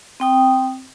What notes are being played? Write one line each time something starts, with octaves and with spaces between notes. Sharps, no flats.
C4 G5 D#6